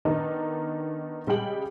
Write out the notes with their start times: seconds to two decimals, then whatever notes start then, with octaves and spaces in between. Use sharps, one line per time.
0.05 D#3 B3 D4 D#4 A#4
1.27 C#3 G3 G#3 G#4 G5 F#7